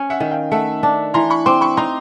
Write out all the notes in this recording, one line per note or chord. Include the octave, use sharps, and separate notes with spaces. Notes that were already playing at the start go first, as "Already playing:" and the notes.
Already playing: C#4
E5 F#5
D#3
F5 G5
A3 E5 F#5
D4
E3 A#5 C6
B5 C#6
C4 C6 D6
B5 C#6
D#4 A#5 C6